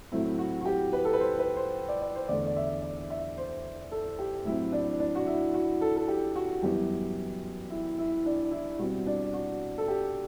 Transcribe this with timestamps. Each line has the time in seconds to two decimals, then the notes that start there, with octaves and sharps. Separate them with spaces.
0.12 A2 F#3 A3 C4 E4
0.39 F#4
0.61 F#4
0.65 G4
0.93 B4
1.05 A4
1.13 B4
1.20 C5
1.39 B4
1.56 C5
1.89 D5
2.02 D5
2.15 C5
2.28 E2 D3 A3 D5
2.47 D5
2.56 E5
2.82 D5
3.10 E5
3.37 C5
3.92 A4
4.19 G4
4.45 A2 F#3 C4 E4
4.72 D4
5.00 D4
5.15 F#4
5.27 E4
5.54 F#4
5.81 A4
5.97 A4
6.08 G4
6.36 F#4
6.62 F#2 E3 G3 B3 G4
7.70 E4
7.98 E4
8.26 D4
8.51 E4
8.79 B2 G3 C4 F#4
9.07 D4
9.33 F#4
9.78 A4
9.88 G4